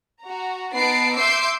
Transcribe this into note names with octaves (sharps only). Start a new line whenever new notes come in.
F#4 A#5
B3 D#4 F#5 A5 C7 D7
E5 C6 D6 E6 G6 C7